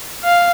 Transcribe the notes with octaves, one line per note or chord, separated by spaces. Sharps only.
F5